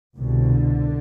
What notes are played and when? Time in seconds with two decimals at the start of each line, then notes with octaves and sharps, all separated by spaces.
0.16 C2 B2 D3